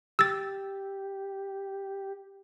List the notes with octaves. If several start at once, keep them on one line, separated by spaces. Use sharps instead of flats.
G4 E6 A6